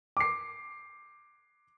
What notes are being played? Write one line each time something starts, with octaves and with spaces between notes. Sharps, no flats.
D6 C7